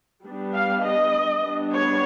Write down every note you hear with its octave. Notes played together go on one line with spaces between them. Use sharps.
G3 B3 D4
F5
D#5
G3 B3 D4
C#5